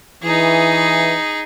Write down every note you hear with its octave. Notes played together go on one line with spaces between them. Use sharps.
E3 D#4 G#4